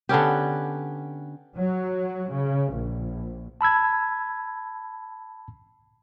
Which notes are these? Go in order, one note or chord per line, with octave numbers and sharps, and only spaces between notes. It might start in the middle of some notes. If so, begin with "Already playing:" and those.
D3 B3 C#4 G4
F#3
C#3
A#1
A5 B5 E6 G#6